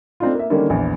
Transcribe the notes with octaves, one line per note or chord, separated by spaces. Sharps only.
A3 C4 D4 D#4 F4
A#3 E5
D3 D#3 G3 A#3 C#4
A#1 E2